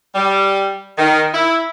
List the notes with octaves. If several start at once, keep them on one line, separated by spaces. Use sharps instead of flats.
G3
D#3
E4